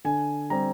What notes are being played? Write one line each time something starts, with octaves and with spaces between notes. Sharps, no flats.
D3 G#5
G3 C4 A#5